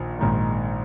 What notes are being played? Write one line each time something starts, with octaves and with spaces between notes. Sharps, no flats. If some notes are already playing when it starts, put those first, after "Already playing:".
Already playing: A#1 D#3
A#1 G#2 D#3